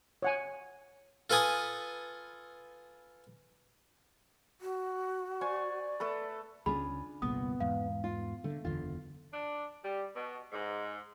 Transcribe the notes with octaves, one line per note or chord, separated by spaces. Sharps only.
C#5 F#5 G#5
F4 A4 B4 G#5 D#6
F#4
C5 D5 G#5 C#6
A3 A4 B4
C#2 C#4 D4 F4 G#4 B5
G1 C2 A#2 B3 D#6
E2 G#2 F5
F4
D3 A3
F#1 E2 D3 F4
D4
G3
B2
G#2